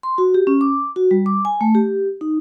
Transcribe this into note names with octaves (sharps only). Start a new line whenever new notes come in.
C6
F#4
G4
C#4
D6
F#4
G3
D6
G#5
A3
G4
D#4